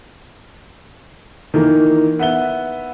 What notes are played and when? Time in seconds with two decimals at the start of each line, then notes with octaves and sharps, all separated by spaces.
1.54 D#3 E3 A#3
2.19 B3 E5 G7